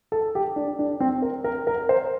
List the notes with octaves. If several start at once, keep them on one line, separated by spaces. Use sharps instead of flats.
A4
G4
D4
D4
C4
A#4
A#4
A#4
C5